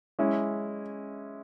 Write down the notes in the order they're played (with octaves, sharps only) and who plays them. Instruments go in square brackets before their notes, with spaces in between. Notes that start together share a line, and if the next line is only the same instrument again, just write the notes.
[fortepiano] G#3 C#4 E4